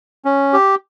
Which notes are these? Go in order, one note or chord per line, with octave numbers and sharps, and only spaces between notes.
C#4
G4